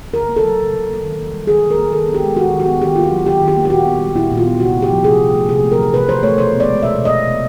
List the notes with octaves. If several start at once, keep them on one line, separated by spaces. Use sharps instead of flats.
C#3 A#4
A#3
A4
F#3
C#3
C#3
A#3
D#3
A#3
G3
D#3 G#4
D#3
A#4
A#3
D#3 A4
B3
G4
G#3
D#3 F#4
D#3
F#4
B3
D#3 G4
A#3 F4
F#4
F#3
D#3 G4
D#3
G4
A#3
G4
A#2 F#4
B3
G3
A#2 E4
A#2
F4
B3
C3 F#4
A3
G4
F3
C3 G#4
C3
A3
C3 G#4
A3
A#4
E3
C3 B4
C3 C5
A3 C#5
B2 C5
B3
D5
G#3
B2 E5
B2
D#5
B3
C3